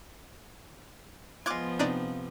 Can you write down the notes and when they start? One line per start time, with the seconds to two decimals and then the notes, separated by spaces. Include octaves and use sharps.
1.46 F3 G#3 B3 F4 D6 F#6 G#6
1.79 C3 D4 D#4 D5